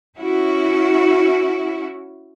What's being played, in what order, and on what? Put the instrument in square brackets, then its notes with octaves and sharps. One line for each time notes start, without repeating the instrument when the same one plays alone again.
[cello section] C#4 E4 F#4